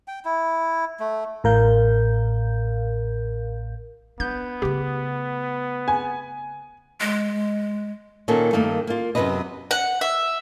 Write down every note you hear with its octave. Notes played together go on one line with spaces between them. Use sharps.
G5
E4
A3
A1 A2 A#4 F5 G6
B3 D4 G6
C#3 A3 G4
G#5
G#3
A#2 D#3 A#3 C#4 A4
G2 D#3 A3 A#3
A#3 F4
F#2 C3 D#3 B3 B4 D#5
F#5
E5